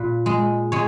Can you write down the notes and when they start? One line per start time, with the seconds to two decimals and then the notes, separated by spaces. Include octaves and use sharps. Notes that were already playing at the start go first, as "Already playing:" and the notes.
Already playing: A#2 B4
0.26 G#3
0.72 G#3 C#5